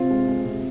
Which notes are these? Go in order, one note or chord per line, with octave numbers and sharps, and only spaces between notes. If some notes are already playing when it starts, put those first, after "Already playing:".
Already playing: C3 C4 F4
G#3
G#3
C3